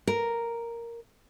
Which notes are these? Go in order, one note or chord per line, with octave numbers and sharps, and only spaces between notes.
A#4